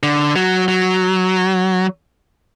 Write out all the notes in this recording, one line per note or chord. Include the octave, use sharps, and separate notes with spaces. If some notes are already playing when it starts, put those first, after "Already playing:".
D3
F#3
F#3